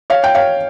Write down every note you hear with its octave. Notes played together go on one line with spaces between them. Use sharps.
C#5 F5
G5
C#5 F5